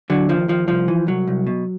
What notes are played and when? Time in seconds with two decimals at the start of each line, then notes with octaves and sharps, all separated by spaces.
0.10 D3 F#3
0.29 D#2 F3
0.48 D#2 F3
0.68 C2 F3
0.88 E3
1.07 C2 F#3
1.27 C2
1.47 B2